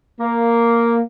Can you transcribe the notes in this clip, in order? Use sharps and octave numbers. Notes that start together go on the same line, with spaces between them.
A#3